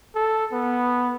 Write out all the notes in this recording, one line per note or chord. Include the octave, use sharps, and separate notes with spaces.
A4
B3